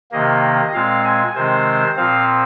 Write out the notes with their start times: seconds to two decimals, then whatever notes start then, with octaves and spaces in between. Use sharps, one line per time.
0.12 C3 D#3 A#3 D#5
0.73 A#2 G#3 C4 F5
1.04 G#5
1.35 C3 D#3 G#3 C4 C5
1.96 A#2 F3 C4 F5